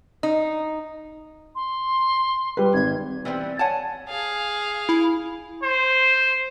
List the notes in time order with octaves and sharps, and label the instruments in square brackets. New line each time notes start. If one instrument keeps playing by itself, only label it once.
[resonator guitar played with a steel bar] D#4
[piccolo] C6
[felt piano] G3 B4
[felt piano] G#1 [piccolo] G#6
[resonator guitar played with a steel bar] E3 G3 B3 C4
C#5 F#5 G#5 A5
[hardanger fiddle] G#4 F5
[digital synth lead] E4
[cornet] C5